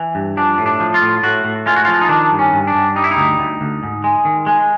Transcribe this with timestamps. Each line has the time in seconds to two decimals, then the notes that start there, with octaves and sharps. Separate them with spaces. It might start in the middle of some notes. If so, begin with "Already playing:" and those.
Already playing: E3
0.15 G2
0.37 F3 D4
0.58 A2
0.66 D4
0.80 F3
0.94 F4
1.02 A2
1.23 A2 F#4
1.45 A2
1.66 G#3 F4
1.76 F#4
1.85 F3 F4
2.01 D#4
2.09 D#3 D4
2.32 G2
2.39 C#4
2.53 G2
2.67 D4
2.75 G2
2.96 G3 D#4
3.04 E4
3.11 D#4
3.17 D2
3.39 D2
3.61 D2
3.83 G#2
4.04 G#3
4.25 D#3
4.47 G#3